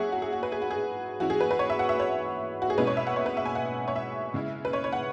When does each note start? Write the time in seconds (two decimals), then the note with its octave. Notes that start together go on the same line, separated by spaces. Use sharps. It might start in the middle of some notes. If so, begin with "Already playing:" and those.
Already playing: F#3 C#4 E4 G#4 C#5 E5 F#5
0.12 F#4
0.22 G#4
0.33 F#4
0.43 B4
0.52 G#4
0.62 F#4
0.70 G#4
1.20 E3 C#4 E4 F#4
1.30 G#4
1.40 B4
1.51 B4
1.59 C#5
1.70 E5
1.79 F#5
1.89 E5
2.00 C#5
2.62 F#4
2.70 G#4
2.78 B2 G#3 C#4 E4 B4
2.87 C#5
2.97 E5
3.07 F#5
3.16 C#5
3.26 B4
3.37 E5
3.45 G#5
3.55 F#5
3.88 C#5
3.96 E5
4.34 C#3 G#3 E4
4.65 B4
4.73 C#5
4.84 C#5
4.93 F#5